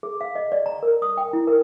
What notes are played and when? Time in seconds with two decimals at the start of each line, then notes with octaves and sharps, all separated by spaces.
0.03 G#4
0.21 F5
0.35 D#5
0.52 D5
0.66 A#5
0.83 A#4
1.02 D#6
1.17 G5
1.33 E4
1.47 A#4